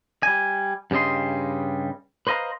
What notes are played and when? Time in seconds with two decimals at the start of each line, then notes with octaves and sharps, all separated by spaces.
0.23 G3 G#5
0.91 G2 C#3 G3 D#5 C6
2.27 B4 C5 D#5 F5 A#5